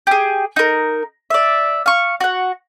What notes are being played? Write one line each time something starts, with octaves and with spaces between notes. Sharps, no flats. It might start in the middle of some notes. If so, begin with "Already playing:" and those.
G4 G#4
D#4 A#4
D5 E5
F5 C#6
F#4 F#5